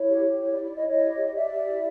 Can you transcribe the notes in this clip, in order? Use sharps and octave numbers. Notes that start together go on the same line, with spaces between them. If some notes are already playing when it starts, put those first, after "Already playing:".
Already playing: E4 C#5
G4
G4
E4 C#5
D5
E4
D5
E4 C#5 D#5
E4 C#5 D#5
G4
G4
D#5
G4 D5 E5
G4
E4